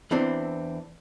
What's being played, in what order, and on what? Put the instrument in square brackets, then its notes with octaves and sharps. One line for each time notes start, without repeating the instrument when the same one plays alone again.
[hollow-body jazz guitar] E2 E3 C4 D4